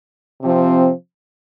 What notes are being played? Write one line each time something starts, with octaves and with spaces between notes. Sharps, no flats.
C3 F3 C4